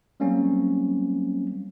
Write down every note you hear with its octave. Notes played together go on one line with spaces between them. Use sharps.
F#3 G3 A#3 C4 C#4